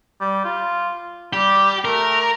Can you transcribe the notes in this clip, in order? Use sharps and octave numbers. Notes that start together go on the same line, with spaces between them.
G3
F4
G3 G4
A3 A#4